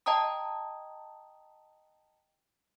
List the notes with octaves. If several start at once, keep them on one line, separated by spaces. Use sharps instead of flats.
D#5 G5 A5 A#5 D#6